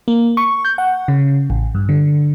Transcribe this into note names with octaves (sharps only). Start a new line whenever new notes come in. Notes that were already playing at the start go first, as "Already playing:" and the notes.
A#3
C#6
G6
F#5
C#3
A1
G2
D3